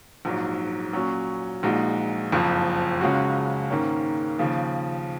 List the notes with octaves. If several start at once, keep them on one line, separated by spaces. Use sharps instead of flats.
A#1 G#2 F#3
A#2 F#3 C#4
A#1 A#2 G#3 D#4 F#4
F#1 F2 F3
C#2 C#3 G#3 C#4 F#4
G#2 D#3 A#3 C#4
D#2 C#3 F3